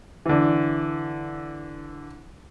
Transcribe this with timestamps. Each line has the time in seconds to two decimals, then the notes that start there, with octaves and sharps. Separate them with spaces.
0.26 D3 E3